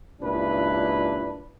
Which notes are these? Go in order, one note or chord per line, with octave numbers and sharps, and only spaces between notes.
C#2 G2 A#2 D4 E4 B4